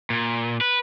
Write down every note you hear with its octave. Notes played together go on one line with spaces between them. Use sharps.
A#2
B4